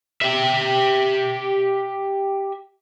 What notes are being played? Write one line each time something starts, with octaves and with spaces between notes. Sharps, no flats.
G4 E5